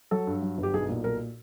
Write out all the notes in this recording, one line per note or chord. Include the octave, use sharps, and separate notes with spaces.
F#3 A4
G2
F#3
G1
G4
B1 G#4
A#2
B1 A#4